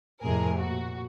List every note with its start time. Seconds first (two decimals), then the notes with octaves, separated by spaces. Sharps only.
0.22 F2 A2 C3 G#4 A#4
0.57 A#2 F#4